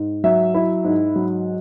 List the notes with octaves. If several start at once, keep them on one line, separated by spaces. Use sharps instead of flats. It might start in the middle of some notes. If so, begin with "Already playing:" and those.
Already playing: G#2
F#3 E5
E4
G#2
F#3